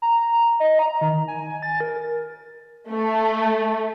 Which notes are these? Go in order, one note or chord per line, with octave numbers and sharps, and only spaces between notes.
A#5
D#5
A#5
D#3
G#5
A6
A#4
A3